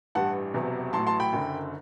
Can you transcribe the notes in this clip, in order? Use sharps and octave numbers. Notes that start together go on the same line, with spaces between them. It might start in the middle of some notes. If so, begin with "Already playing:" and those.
A1 G2 E3 G3 F#5 A5
E1 E2 C3 F#3
A1 A2 F#3 A5 C6
A5 C6
G5 B5
F#1 F#2 D3